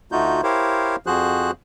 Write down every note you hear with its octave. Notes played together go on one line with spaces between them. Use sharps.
D2 A3 D#4 F4 F#4 G6
E4 G4 A#4 C5 C#5 F5
F2 F3 F#4 G#4 C5 F#6